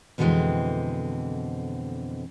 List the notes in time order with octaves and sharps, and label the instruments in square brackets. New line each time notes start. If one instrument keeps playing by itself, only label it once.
[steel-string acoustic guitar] F2 B2 D3 E3 G#3 C4